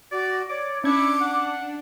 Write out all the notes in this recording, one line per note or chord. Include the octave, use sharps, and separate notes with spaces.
F#4 D5
C#5 D5 D6
C#4 D4 E4 D6 G#6 C#7
D4 F#5